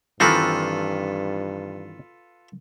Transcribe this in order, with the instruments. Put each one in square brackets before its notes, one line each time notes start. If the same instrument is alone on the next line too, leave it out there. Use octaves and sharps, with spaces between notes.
[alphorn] G2 [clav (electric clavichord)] D#3 E3 C4 [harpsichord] F4 A4 B4